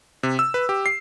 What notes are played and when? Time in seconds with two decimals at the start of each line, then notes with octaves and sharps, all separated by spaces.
0.23 C3
0.39 E6
0.54 B4
0.69 G4
0.86 C7